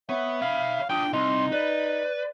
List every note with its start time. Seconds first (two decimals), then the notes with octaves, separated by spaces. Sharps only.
0.09 B3 C#5 E5
0.42 C#5 F5 B5
0.90 D4 F4 G5 D#6
1.13 C2 D#4 C6
1.52 B4 D5